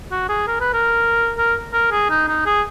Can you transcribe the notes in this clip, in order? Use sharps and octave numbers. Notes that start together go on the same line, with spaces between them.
F#4
G#4
A#4
B4
A#4
A#4
A#4
G#4
D#4
D#4
G#4